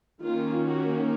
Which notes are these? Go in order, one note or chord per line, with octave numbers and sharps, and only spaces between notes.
D#3 A#3 C#4 F4
F#4